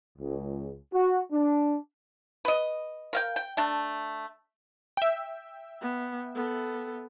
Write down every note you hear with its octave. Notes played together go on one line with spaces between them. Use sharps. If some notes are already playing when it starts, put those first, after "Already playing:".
C#2
F#4
D4
B4 D#5
A#4 F5 G5
G5
A3 D4
E5 G5
B3
B3 A4